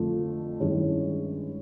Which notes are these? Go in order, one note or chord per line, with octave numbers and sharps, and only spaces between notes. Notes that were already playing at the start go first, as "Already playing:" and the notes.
Already playing: F2 D3 F3 A3
G2 D#3 G#3 C#4 E4